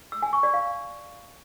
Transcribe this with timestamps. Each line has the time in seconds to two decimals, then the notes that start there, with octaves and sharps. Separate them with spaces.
0.12 E6
0.22 G#5
0.33 C#6
0.43 D5
0.54 F5